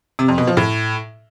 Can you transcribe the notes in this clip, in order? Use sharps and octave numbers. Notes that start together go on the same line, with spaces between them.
C3
F2
B2
F3
A2